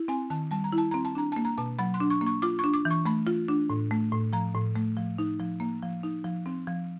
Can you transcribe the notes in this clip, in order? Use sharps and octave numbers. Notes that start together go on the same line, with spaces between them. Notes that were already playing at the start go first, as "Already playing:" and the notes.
Already playing: E4
C4 G#5
D#3 A5
G3 A5
A#5
E4
A5
C4 A#5
A5
D4 A#5
A#3 A5
A#5
B2 A5
F#3 B5
C6
D4
C#6
A#3
C#6
F4 D6
D4 C#6
D6
E3
C#6
A3 B5
F4
D4
A2
A3
A2
F3 A#5
A2
A3
F3
D#4
F3
A#3
F3
D#4
F3
C4
F3